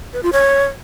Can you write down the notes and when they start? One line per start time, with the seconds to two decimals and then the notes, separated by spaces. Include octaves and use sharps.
0.14 B4
0.23 F4
0.33 C#5